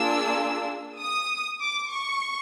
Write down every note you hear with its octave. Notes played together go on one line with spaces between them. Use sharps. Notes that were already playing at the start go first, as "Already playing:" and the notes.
Already playing: A#3 D4 F4 G#4 E6
D#6
D6
C#6